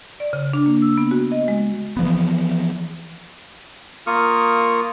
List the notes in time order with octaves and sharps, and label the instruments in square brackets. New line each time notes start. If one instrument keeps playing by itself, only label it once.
[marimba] D5
C#3
D4
A#3
E6
B3
F#4
D#5
G#3
[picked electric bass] E3 F3 B3
[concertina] A#3 F4 A#4 C#6 D#6 F6